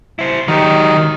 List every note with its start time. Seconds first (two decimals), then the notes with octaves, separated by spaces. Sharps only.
0.19 E4 C5
0.48 D#3 F#3 G4